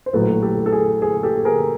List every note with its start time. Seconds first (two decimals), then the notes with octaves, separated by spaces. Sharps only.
0.06 C5
0.13 A#1 A2 F#3 A4 B4
0.42 G4 A4
0.66 A4
0.73 G#4
1.02 G#4
1.23 G4 A4
1.45 G#4 A#4